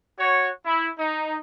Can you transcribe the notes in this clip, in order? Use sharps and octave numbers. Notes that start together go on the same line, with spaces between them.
F#4 C#5
E4
D#4